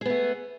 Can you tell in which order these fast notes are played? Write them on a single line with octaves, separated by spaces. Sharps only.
G#4 B3 A3